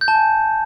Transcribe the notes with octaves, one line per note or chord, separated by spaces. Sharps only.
G6
A5
G#5